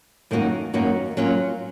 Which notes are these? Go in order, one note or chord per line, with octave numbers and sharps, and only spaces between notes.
F#2 D#3 A#3 D#4 F#4
F#2 D#3 A#3 D#4 F#4
F#3 A#3 C#4 F4